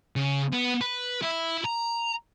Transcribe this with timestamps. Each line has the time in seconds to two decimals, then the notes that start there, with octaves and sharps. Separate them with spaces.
0.16 C#3
0.53 B3
0.81 B4
1.22 E4
1.64 A#5